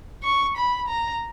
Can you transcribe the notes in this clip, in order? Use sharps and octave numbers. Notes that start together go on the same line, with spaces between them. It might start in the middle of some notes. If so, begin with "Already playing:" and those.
C#6
B5
A#5